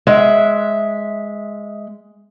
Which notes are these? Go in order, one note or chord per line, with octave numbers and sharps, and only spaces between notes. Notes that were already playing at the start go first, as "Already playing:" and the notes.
G#3 E5